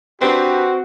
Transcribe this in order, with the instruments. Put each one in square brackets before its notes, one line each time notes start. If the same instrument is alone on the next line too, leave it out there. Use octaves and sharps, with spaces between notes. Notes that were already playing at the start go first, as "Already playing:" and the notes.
[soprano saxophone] C4 [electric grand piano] D4 G4 B4 [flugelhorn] F#4